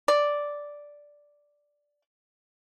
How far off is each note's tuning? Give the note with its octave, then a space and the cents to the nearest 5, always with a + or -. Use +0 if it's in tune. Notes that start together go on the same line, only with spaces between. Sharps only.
D5 -5